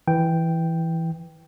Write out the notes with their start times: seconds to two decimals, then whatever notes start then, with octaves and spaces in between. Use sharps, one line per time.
0.08 E3 G5